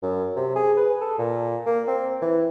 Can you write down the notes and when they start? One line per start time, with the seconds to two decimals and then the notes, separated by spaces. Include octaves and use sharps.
0.03 F#2
0.36 C3
0.55 G#4
0.77 B4
1.01 A4
1.19 A#2
1.66 A#3
1.88 C4
2.22 E3